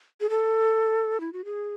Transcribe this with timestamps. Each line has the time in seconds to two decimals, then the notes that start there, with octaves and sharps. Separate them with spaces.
0.21 G#4
0.30 A4
1.20 E4
1.33 F#4
1.45 G#4